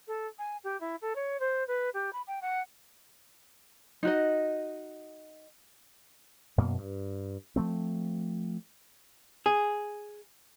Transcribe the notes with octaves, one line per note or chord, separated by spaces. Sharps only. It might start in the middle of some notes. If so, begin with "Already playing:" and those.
A4
G#5
G4
E4
A4
C#5
C5
B4
G4
B5
G5
F#5
D#4 F#4 D#5
F#2 B2 A#3
G2
F3 A3 C4
G#4